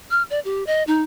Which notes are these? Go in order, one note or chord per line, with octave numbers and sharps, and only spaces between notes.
F6
D5
G4
D#5
D#4